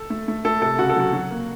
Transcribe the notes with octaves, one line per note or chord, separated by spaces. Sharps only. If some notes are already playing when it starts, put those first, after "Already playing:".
Already playing: A4
A3
A3
A3 A4
C3 A4
C#3 F#4
A4
F#3 F#4
F#3
A#3